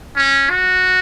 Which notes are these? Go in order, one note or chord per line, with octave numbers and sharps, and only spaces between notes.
C#4
F#4